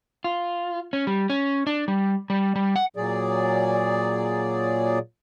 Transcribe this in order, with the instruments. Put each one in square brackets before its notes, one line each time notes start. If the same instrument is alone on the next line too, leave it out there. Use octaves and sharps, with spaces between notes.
[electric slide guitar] F4
C#4
G3
C#4
D4
G3
G3
G3
F#5
[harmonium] A#2 F#3 G#4 D5